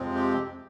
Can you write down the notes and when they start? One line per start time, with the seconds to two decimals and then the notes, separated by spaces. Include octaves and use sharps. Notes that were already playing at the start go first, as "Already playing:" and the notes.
Already playing: F2 C3 F3 G#3 C4
0.15 G4